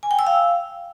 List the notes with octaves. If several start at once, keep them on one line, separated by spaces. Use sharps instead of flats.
G#5
G5
E6
F5